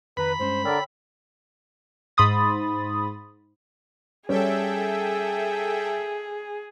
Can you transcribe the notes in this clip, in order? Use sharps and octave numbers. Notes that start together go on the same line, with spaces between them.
F2 D#3 B4 A#5 B5
G2 G#3 C#4 C5
D3 A#4 C#5 D5 G5 E6
G#2 B5 C6 D#6 A6
G3 C#4 G#4 A4 E5 G5